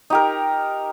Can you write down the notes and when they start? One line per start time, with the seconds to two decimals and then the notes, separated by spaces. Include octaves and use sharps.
0.10 D#4 G4 A#4